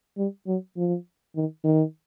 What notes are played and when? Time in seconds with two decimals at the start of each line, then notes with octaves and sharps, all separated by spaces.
0.17 G3
0.47 F#3
0.77 F3
1.36 D#3
1.64 D#3